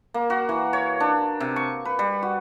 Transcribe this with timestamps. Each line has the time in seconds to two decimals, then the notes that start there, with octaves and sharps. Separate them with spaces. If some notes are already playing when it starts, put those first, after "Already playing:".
0.14 A#3
0.30 F#4
0.49 E3
0.73 C#5
1.00 D4
1.40 C3
1.56 C#6
1.85 B4
1.99 G3
2.23 F#4